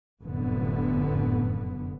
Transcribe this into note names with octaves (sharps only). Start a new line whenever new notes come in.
F1 F#2 A2 D3 B3